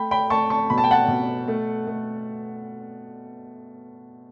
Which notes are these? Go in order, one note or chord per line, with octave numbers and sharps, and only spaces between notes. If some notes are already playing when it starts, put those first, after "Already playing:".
Already playing: A3 G5 B5
G5 B5
A3 A5 C#6
A5 C#6
B2 B5
A5
G5
F#5 A5
B2
A3
A3